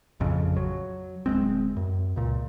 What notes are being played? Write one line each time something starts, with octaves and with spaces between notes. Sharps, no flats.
A1 F2 C#3
F#3
D1 E2 G#3 C4
F#2
C#2 A#2